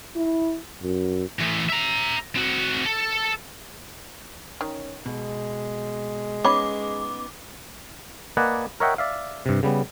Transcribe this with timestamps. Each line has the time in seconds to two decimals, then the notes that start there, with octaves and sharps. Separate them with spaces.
0.16 E4
0.82 F#2
1.39 E3 A3
1.69 E5 A#5
2.36 C4 F#4
2.85 A4
4.61 D#3 C#4
5.06 B2 G#3
6.45 B3 C#4 D#4 C#5 B5 D6
8.37 A#3 B4 D5 D#5 F#5 G#5
8.80 A#4 C#5 D#5 E5 F#5 G5
8.98 D5 E5 F5
9.46 G2 C3
9.63 C#3 G3 B3